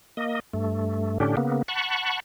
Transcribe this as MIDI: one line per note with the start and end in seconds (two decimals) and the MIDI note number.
0.17 0.40 58
0.17 0.40 75
0.53 1.18 43
0.53 1.18 57
1.20 1.36 45
1.20 1.36 50
1.20 1.36 61
1.20 1.36 62
1.20 1.36 67
1.37 1.62 49
1.37 1.62 58
1.37 1.62 59
1.68 2.20 78
1.68 2.20 81
1.68 2.20 83
1.68 2.20 85